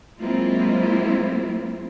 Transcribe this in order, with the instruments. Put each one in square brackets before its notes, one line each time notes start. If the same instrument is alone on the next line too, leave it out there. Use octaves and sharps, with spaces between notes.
[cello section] F#3 G#3 A#3 C4 E4 F4